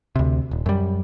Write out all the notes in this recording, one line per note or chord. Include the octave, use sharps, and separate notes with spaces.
D2 C3
D#1
F#2 G3